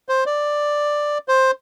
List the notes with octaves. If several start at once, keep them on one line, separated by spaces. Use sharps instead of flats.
C5
D5
C5